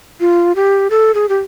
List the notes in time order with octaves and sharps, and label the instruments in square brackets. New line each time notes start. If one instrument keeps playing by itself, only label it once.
[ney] F4
G4
A4
G#4
G4